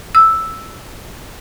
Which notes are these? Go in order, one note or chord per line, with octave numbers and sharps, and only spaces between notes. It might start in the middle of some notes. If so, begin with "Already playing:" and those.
E6